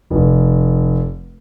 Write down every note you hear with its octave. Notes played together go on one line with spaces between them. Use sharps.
F1